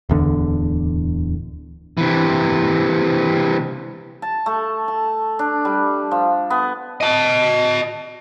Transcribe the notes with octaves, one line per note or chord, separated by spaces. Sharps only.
D1 E2 D3
C3 E3
A5
A3
A5
D4
G3
F3
B3
D#5 A5